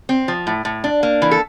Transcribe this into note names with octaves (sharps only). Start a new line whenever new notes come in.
C4
F3
A2
A2
D4
A#3
E3
A4